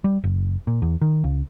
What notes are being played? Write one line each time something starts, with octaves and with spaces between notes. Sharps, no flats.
G3
F#1
A#2
E2
D#3
C#2